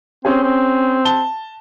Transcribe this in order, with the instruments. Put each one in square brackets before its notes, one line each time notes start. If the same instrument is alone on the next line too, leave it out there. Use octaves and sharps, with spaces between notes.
[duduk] C4 [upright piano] C#4 G#4
[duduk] C4
[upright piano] A5 G7